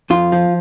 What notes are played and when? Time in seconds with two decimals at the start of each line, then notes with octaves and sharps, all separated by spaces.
0.10 F2 F4
0.32 F3